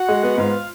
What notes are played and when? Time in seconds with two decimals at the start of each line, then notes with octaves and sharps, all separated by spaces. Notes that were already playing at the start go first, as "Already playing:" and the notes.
Already playing: F#4 F#5
0.08 G#3
0.23 B3
0.38 G#2 F4 F5